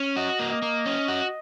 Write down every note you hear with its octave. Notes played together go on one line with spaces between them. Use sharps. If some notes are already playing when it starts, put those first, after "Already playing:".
Already playing: C#4
F#4 D#5
A#3
D#5
A#3
C#4
F#4